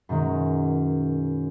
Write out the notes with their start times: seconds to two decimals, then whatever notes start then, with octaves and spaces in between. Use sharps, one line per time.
0.09 F#2 B2 D#3 G#3